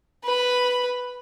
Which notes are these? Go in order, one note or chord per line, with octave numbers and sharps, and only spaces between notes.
B4 B5